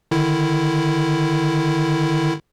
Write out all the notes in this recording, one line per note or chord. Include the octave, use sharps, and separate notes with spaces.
D3 D#3 E4